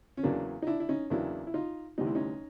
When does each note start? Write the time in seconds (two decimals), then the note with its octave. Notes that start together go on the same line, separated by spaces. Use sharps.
0.17 C#4
0.23 E2 C#3 F#3 A#3 D4
0.62 D#4
0.67 D4 E4
0.80 E4
0.89 C#4 D#4
1.10 E2 C#3 F#3 A#3 D4 E4
1.47 E4
1.54 D#4 F4
1.98 D2 C3 E3 G3 D#4
2.07 E4
2.15 C#4 D#4